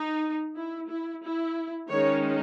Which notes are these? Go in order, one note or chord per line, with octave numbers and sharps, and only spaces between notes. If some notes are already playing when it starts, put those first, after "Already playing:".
Already playing: D#4
E4
E4
E4
D#3 G#3 C#4 C#5